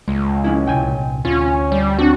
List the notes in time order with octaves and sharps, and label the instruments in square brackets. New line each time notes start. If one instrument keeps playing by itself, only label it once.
[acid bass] C#2 [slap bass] G#3
[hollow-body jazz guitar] F3 C#4 E4
[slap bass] C2 A#2 [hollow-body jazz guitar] G5 G#5
[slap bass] D2 [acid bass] C#4 [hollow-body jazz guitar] F4
[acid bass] G3
[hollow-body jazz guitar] C4 D4 [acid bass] F#4